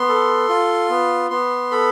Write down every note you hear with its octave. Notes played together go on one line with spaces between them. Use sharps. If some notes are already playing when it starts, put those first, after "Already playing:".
Already playing: B3 C6
A4
F4
B3
B3 C6
A4 B5